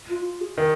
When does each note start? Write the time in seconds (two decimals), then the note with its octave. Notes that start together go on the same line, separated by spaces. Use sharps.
0.09 F4
0.25 F4
0.41 G#4
0.58 D#3